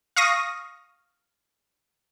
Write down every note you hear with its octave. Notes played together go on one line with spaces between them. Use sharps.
F5 C#6 D#6 A#6